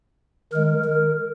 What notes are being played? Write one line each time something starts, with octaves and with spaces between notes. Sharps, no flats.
D#3 G#3 A#4
A#4